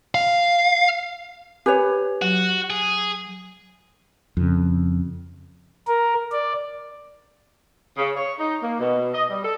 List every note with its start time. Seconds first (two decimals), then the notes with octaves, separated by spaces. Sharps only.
0.15 F5
1.66 G4 B4 C#5 G#5
2.22 F#3 F#4
2.70 G#4
4.37 F2 C#3
5.88 A#4
6.31 D5
7.97 C#3
8.17 C#5
8.39 D#4
8.62 A#3
8.80 B2
9.13 D#5
9.29 G3
9.44 A4